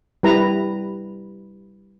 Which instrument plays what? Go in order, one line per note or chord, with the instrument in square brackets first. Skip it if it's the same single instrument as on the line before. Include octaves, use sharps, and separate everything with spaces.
[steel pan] G3 E4 B4 A#5